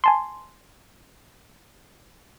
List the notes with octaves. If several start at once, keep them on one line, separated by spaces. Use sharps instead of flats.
G#5 A5 C6